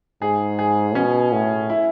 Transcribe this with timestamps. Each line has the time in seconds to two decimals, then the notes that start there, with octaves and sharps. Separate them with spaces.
0.22 G#2 G#4
0.59 G#4
0.95 B2 C#4
1.33 A2
1.70 E4